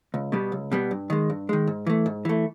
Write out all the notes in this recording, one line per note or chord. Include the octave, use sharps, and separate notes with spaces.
C#2
B2 G3 B3
C#2
B2 G3 B3
G2
D#3 G#3
G2
D#3 G#3
G#2
E3 A3
G#2
E3 A3